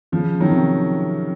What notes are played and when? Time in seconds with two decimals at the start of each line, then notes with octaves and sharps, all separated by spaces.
0.12 C#3 F3
0.40 D#3 F#3
0.51 C3 D#3